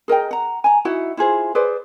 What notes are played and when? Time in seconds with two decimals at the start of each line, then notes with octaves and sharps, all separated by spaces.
0.08 G#4 A#4 D#5 G5
0.31 F#5 A#5
0.64 G#5 A#5
0.85 D#4 E4 F#4 F#5
1.17 E4 F4 G#4 C5
1.55 G#4 B4 C5 D5